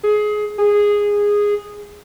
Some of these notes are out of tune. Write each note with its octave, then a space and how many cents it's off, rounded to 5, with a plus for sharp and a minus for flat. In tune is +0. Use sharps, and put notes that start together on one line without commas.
G#4 +20
G#4 -10